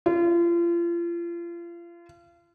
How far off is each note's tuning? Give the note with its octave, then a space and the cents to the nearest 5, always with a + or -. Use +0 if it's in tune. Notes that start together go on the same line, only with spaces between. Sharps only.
F4 -35